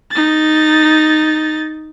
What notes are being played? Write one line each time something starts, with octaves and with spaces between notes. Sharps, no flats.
D#4 A6